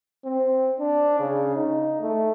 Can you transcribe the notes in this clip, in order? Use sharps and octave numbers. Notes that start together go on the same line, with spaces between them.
C4
D4
C#3
D#4
A3